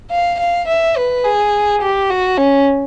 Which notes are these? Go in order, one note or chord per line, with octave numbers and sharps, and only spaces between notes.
F5
F5
E5
B4
G#4
G4
F#4
C#4